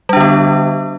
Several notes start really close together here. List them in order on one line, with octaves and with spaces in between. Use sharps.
G3 D4 D3 B3